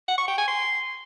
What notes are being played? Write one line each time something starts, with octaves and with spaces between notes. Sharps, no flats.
F#5
C#6
G5
G#5
C6